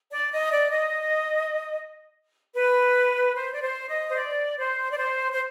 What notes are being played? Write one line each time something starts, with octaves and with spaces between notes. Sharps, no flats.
D5
D#5
D5
D#5
B4
C5
D5
C5
D#5
C5
D5
C5
D5
C5
C5